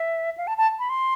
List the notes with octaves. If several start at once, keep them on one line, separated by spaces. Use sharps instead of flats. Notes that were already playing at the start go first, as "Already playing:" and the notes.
Already playing: E5
F5
A5
A5
B5
C6